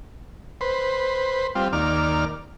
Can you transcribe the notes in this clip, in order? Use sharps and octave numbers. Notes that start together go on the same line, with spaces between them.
B4 C5
G3 C4 F4
D#2 A#3 D5 F6